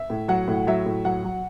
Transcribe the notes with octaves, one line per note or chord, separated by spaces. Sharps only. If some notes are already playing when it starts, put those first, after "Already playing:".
Already playing: E5
A2
F#3 F#5
A2
F#3 E5
A2
F#3 F#5
F#3